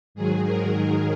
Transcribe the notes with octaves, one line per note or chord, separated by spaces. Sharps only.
G#2 D#3 F#3 G#4
A#4